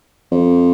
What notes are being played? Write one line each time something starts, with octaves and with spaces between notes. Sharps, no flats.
F2